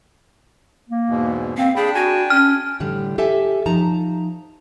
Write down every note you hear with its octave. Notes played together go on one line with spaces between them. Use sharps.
A#3
E2 G#2 B2
C4 F5
D4 G#4 G5 A5 B5
F#4 G#5
C#4 F6
A2 D3 G3
G4 A4 E5 G#5
F3 D#4 A5 A#5